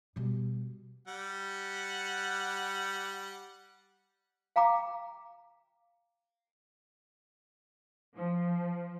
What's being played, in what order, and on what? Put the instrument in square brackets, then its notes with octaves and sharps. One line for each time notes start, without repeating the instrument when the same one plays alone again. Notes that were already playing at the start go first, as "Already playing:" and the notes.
[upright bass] B2 G3
[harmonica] G3 F#5
[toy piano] F5 G5 A#5 D6
[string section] F3